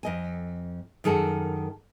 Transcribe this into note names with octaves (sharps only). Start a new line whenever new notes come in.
F2 D#5 G#5
F#2 D#3 G#4 A4 F#5